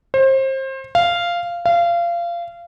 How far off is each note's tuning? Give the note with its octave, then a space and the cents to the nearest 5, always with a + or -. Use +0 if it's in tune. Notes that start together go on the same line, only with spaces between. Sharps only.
C5 +30
F5 -10
F5 -25